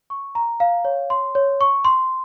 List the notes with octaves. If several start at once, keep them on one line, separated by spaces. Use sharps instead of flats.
C#6
A#5
F5
C#5
C6
C#5
C#6
C6